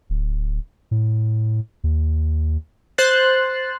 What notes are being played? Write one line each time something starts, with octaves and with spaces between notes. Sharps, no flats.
D1
A2
D#2
C5 F#6 A6 C7